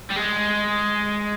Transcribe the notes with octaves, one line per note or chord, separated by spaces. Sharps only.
G3
G#3